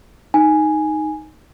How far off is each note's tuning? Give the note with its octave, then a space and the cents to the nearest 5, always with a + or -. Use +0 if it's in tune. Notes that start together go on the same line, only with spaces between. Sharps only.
D#4 +0 G#5 +0